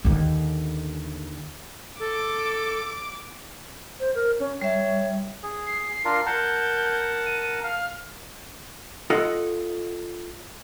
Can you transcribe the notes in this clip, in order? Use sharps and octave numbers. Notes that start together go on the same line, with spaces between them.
D#2 D3
A4 D6
C5
A#4
C#4
G3 C#5 E5
G#4
C7
D4 F4 A#4
A#4 F#5 A5 G6
D#7
F5 F6
F4 A4 D#5 F#5